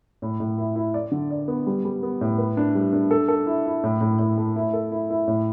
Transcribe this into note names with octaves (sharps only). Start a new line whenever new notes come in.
A2
A2
E4
E4
D5
D3
D5
B3
G3
G3
B3
A2
B4
D4
G3
D4
A4
A4
E4
E4
A2
A2
A2
A3
E4
A4
E4
E4
A2